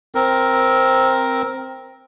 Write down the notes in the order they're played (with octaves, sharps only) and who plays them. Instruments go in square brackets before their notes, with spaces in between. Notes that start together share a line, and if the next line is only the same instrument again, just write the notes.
[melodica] C4 A#4